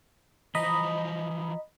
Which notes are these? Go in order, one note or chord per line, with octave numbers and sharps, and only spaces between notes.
E3 F3 C5 D#5 A#5 B5